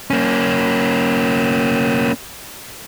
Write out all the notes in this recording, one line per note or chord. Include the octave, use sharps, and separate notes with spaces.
A#3 C#4